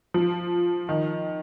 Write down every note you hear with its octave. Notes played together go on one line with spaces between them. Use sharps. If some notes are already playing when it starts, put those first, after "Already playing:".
F3
D#3